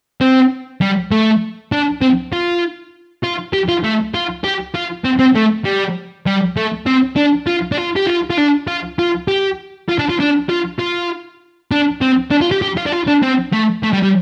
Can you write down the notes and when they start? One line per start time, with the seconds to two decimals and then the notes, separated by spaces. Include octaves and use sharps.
0.21 C4
0.81 G3
1.11 A3
1.72 D4
2.02 C4
2.33 F4
3.24 F4
3.53 G4
3.69 F4
3.84 A3
4.14 F4
4.44 G4
4.75 F4
5.05 C4
5.20 C4
5.36 A3
5.65 G3
6.27 G3
6.57 A3
6.87 C4
7.16 D4
7.47 F4
7.72 D4
7.78 F4
7.96 G4
8.07 F4
8.31 F4
8.38 D4
8.68 F4
8.99 F4
9.28 G4
9.89 F4
9.99 D4
10.09 F4
10.20 D4
10.49 F4
10.79 F4
11.72 D4
12.01 C4
12.31 D4
12.42 F4
12.51 G4
12.62 G4
12.77 F4
12.86 D4
12.92 F4
13.07 D4
13.22 C4
13.53 A3
13.83 A3
13.93 G3
14.03 G3